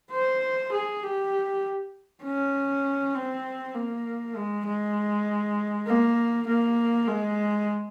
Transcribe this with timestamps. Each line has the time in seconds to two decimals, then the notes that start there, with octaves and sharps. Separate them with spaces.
0.12 C5
0.72 G#4
1.03 G4
2.23 C#4
3.15 C4
3.74 A#3
4.36 G#3
4.67 G#3
5.88 A#3
6.47 A#3
7.08 G#3